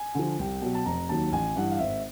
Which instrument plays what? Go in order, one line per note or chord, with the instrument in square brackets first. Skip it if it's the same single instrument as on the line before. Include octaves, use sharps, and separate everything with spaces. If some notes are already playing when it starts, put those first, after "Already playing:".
Already playing: [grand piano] G#5
D3 F3
C2 G5
B2 F#3
A5
F1 A#5
D#2 D#3 F#3 A5
A1 G#5
G2 E3 F#5
F5
G#1 E5